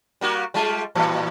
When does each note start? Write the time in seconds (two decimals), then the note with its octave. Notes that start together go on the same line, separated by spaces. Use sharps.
0.21 G3 A#3 F#4
0.54 G3 G#3 F4
0.95 A2 E3 G3